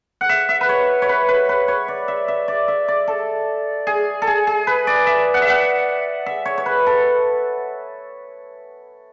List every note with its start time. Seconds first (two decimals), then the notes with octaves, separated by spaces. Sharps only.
0.21 F#5
0.29 E5
0.49 E5
0.61 B4
0.69 C#5
1.02 C#5
1.09 B4
1.28 B4
1.49 B4
1.68 C#5
1.88 D5
2.08 E5
2.28 E5
2.48 D5
2.68 E5
2.88 D5
3.08 A4
3.87 G#4
4.22 A4
4.27 G#4
4.47 G#4
4.67 B4
4.87 D5
5.07 E5
5.34 F#5
5.42 E5
5.50 F#5
6.26 E5
6.45 C#5
6.58 C#5
6.66 B4
6.86 A4